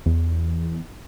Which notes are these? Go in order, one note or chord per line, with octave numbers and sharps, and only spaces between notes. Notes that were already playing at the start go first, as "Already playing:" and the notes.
E2